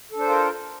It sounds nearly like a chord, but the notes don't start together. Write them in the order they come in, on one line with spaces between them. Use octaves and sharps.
A4 D4 C5 F4 A#4